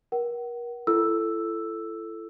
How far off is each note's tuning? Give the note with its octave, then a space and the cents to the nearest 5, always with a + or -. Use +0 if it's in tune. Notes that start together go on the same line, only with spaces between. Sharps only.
A#4 +35 F#5 +35
E4 +35 A4 +0 E6 +0